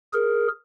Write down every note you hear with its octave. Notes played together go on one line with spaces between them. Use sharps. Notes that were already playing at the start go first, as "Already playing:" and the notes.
G#4 A#4